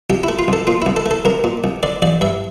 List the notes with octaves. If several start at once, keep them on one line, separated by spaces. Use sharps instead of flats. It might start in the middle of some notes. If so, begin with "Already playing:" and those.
C2 G4
E4
A3
F4
C2 A4
A#2 F4
E4
C2
A4
A3
A4
C2 A#4
A#2
C2
D3 D5
A1 D5
G2 E5